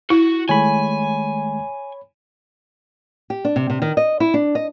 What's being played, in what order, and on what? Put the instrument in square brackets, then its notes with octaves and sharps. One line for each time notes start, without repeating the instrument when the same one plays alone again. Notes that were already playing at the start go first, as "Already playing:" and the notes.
[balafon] E4 [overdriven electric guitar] F#4
[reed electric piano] D#3 G#3 A3 [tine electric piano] C#5 B5 [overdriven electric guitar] G#5
[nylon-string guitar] G4
D4
C3
C3
D#3
D#5
E4
D4
D#5